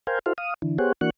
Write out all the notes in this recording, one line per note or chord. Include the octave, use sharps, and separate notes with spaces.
A#4 C5 F5 G5 G#5
E4 F#4 A4 C5 F5
F5 D#6
D3 E3
B3 G4 G#4 C5 C#5 F#5
E3 A#3 D4 F#4 C#6 F#6